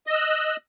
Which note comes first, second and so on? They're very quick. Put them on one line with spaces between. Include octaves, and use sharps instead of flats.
D#5 E6 F#6